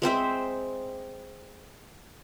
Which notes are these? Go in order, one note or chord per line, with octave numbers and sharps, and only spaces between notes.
G#3 C4 C5 E5